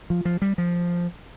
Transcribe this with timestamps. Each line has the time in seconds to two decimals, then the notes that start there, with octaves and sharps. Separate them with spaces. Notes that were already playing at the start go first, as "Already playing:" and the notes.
0.10 F3
0.25 F3
0.42 G3
0.58 F3